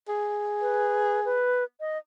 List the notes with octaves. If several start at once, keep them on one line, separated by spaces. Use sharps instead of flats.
G#4
B4
B4
D#5